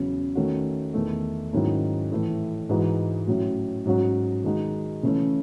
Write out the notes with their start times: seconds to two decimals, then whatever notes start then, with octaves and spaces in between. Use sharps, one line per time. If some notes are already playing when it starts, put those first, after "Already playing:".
Already playing: E2 C#3 F#3 C#4
0.35 D#3 A3 C#4 F#4
0.94 E2 D#3 A3
1.53 G#2 D#3 F#3 C#4 E4
2.12 A2 E3 A3 E4
2.69 G#2 E3 G#3 D#4 F#4
3.27 A2 F#3 C#4 F#4
3.85 G#2 F#3 C#4 F#4
4.44 D#3 G#3 D#4 F#4
5.03 C#3 E3 A3 C#4